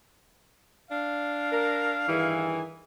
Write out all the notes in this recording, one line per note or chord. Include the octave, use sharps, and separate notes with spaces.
D4 F5
A#4
G2 D#3 E3 G#4